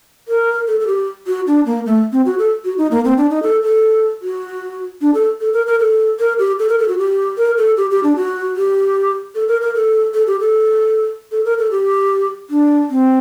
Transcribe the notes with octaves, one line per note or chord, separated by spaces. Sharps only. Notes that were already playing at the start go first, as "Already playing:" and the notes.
A#4
A4
A4
G4
F#4
D4
A#3
A3
C4
F#4
A4
F#4
D#4
A#3
C4
D4
D#4
A4
A4
F#4
D4
A4
A4
A#4
A#4
A4
A#4
G4
A4
A#4
A4
F#4
G4
A#4
A4
G4
G4
D4
F#4
G4
A4
A#4
A#4
A4
A4
G4
A4
A4
A#4
A4
G4
D4
C4